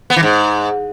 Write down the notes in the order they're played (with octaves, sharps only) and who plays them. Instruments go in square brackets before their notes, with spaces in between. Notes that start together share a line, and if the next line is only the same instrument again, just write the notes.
[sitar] B3
E3
G#2